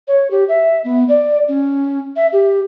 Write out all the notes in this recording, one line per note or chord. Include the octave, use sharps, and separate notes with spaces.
C#5
G4
E5
B3
D5
C#4
E5
G4